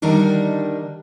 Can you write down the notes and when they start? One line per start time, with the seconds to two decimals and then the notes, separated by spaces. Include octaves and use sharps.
0.02 D3 D#3 G3 D4 D#4 A#4